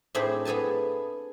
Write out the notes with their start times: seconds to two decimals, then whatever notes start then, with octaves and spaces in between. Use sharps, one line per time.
0.15 A2 C4 D4 G#4 C5 B5
0.45 B3 G#4 A4 G#5 A5